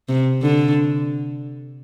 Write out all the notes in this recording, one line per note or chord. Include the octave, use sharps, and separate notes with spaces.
C3
D3